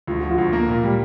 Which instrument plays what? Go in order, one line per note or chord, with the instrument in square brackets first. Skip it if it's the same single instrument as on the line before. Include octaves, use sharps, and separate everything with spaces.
[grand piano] D2 [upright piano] F4
[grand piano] F3 [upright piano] F#4
[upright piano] F4
[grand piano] D2
A#3
A#2
G3